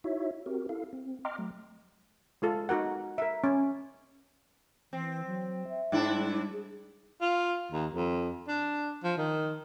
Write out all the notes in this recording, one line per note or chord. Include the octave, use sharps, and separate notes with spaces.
D#4 E4 F#4 C#5 E5
C4 F#4 G4 A#4
E4 A4 F5
C4
D#5 G5 A#5 C6 D6 F6
F#3 A3
G#3 F4 A4
D#4 F#4 A#4 F#5
A#4 E5
C#4
E3 C4
F#3
E5
G#2 D4 E4
G3
G#4
F4
D#2
F2
D4
F3
D#3